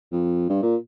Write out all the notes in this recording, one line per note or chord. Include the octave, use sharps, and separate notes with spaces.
F2
G2
A#2